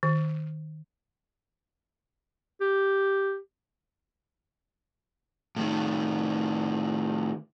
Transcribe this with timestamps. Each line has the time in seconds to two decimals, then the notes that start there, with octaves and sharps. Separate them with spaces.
0.03 D#3
2.61 G4
5.56 A2 D#3